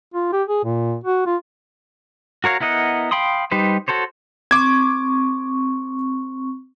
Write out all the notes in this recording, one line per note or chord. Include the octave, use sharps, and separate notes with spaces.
F4
G4
G#4
A#2
F#4
F4
F#4 A#4 C#5 F5
B3 E4 A#4 D#5 F#5
F5 G5 B5 C6 D#6
G3 D#4 G4 B4 C5
F#4 A4 C5 C#5
C4 C#6 D6 G#6